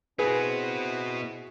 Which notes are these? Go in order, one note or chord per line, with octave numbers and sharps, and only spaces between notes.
B3 C4 E4 F#4 G#4 B4